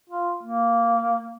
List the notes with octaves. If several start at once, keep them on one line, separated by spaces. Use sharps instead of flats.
F4
A#3